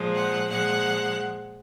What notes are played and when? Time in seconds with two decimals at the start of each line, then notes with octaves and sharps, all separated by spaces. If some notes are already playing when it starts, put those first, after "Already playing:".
Already playing: A#2 F3 G#3
0.13 F#5
0.48 A#2 F3 G#3 F#5